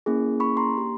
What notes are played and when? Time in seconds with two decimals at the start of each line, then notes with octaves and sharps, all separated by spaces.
0.06 A#3 C#4 E4 G#4
0.40 B5 C#6
0.57 A#5 C6
0.74 A#3 D4 G4